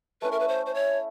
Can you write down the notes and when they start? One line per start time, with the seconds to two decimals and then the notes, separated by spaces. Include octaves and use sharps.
0.22 A3 C#4 E4 B4
0.32 A#4
0.40 B4
0.48 C5
0.66 C5
0.74 C#5